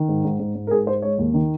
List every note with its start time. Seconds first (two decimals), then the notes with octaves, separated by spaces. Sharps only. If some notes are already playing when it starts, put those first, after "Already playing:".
Already playing: D#3
0.08 G#2
0.24 G#2
0.39 G#2
0.55 G#2
0.67 A#4
0.71 G#2 G#4
0.87 G#3 C5
1.02 G#3 C#5
1.19 D#2
1.34 D#3